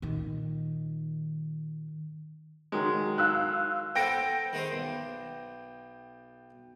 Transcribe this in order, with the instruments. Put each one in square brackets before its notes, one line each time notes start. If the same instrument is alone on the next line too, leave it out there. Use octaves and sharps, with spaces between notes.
[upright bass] A#2 D#3
[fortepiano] D#3 F#3 G#3
[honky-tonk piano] F5 E6 F#6
[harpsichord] B3 A4 C5 [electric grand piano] G5 A#6 D7
[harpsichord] D#3 G#3 C5
B1